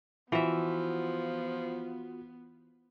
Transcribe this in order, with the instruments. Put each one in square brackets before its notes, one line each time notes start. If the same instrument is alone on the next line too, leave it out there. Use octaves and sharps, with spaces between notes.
[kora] E3 E5 [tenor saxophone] F3 [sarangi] B3 [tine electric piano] F4 F#4